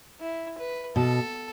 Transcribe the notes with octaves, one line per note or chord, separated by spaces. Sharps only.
E4
B4
B2 A4